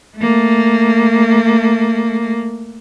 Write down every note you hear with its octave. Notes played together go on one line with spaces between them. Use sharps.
A3 A#3